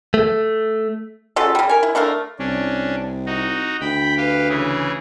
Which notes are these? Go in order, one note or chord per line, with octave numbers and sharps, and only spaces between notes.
A3
C#3 F#3 F4 A4
C#3 G3
A#4 G#5
E4
A3 D4 A#4 F5
C2 C#4 D4
D#4 F#4
D2 G5 B5
G4 B4 F5
C#3 E3 G#4